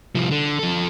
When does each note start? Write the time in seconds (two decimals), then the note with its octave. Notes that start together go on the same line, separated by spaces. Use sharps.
0.15 C2 F3
0.31 D3
0.59 F3 A4